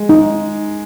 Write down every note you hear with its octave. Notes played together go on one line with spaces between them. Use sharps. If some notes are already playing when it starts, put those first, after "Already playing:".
Already playing: G#3
D#4